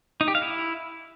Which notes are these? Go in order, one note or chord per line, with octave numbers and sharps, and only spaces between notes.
D#4
G4
F5
E4